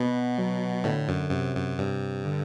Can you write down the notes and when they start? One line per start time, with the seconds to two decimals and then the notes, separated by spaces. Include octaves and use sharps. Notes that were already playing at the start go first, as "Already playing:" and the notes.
Already playing: B2 B3
0.38 F#3
0.84 A2 D3
1.08 F#2
1.31 F#2 C3
1.55 F#2
1.78 G2 C3
2.25 D3